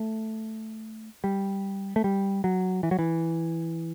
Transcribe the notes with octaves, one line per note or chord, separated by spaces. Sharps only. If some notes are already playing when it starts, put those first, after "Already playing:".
Already playing: A3
G3
A3
G3
F#3
E3
F#3
E3